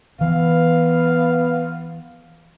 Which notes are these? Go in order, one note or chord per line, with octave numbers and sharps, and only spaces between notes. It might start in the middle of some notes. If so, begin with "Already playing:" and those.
E3 B3 F5